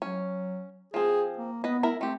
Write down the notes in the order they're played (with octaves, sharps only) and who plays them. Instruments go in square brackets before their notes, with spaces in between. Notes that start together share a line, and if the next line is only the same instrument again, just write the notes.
[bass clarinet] F#3 [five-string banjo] C#4
[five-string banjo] F3 C4 [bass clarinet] G#4
[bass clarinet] A#3
[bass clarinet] B3 [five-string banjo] B4 D#5
[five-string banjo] E4 A#4 E5
[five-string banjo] A3 G4 [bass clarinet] C4